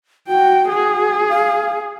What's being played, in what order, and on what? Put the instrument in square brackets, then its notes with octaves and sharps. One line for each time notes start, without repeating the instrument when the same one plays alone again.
[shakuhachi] F#4 [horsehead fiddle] G5
[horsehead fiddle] G#4
[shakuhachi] F5